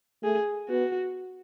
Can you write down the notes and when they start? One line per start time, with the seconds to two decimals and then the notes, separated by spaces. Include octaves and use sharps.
0.23 A3 G#4
0.69 B3 F#4